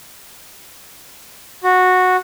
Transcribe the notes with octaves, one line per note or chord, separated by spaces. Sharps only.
F#4